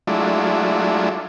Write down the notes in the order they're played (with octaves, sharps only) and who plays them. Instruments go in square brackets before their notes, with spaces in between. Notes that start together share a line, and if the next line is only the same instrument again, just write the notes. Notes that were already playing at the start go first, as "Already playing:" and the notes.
[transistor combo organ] F#3 G#3 A3 D4 E4 F4